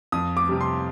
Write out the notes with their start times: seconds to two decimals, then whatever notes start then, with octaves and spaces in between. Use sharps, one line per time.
0.12 F2 D#6
0.37 D6
0.49 C3 G3
0.61 C6